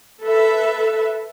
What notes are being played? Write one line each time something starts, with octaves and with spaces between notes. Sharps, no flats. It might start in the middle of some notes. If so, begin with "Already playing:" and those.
A4 B4 E5